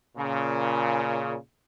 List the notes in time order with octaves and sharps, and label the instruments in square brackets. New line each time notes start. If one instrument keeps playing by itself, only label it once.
[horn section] A#2 C#3